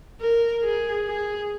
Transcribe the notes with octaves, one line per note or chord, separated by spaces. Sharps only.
A#4
G#4
G#4